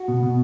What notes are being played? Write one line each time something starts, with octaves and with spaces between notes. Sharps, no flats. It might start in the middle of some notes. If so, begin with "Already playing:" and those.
Already playing: F#4
B2
B2